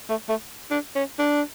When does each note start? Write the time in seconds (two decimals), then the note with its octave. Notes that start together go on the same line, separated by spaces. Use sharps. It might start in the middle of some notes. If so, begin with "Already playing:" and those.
0.10 A3
0.29 A3
0.71 D4
0.95 C#4
1.19 D4